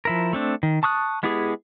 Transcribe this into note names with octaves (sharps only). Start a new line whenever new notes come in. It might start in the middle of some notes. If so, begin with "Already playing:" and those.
F3 E4 A#4
A3 C4 D4
D#3
A5 C#6 D#6 F#6
G#3 B3 E4 G4 G#4